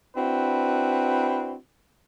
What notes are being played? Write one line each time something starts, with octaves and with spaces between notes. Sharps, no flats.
C4 D4 E4 F#4 B4